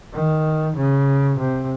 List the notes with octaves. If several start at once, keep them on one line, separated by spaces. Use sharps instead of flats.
D#3
C#3
C3